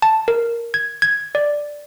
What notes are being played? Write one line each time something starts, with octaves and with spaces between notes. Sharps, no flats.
A5
A#4
G#6
G#6
D5